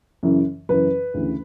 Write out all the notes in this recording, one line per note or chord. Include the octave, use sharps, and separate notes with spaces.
F#2 C#3 E3
F#2 C#3 E3 B4
D2 C#3 E3